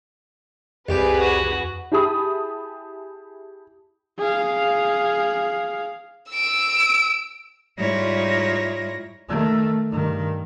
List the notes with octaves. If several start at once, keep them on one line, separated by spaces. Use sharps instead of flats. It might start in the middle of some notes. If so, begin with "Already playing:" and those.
C2 F2 G4 G#4 B4
F#4
E4 G4 G#4 A5 B5 D#6
G#4 F5
E6 D7
G#2 G3 E4 F4 C#5 A#6
D#3 A3
G2 D#3